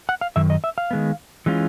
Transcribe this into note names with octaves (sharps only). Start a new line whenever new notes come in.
F#5
F5
F#2 D#3 E5
D#5
E5
F5
D#3 G#3 B3
E3 G#3 C#4 F4